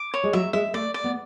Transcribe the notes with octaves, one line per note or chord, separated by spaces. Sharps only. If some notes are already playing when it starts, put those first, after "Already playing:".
Already playing: D6
C#5
G#3
F#3 E5
G#3 E5
A3 D5
D5
B3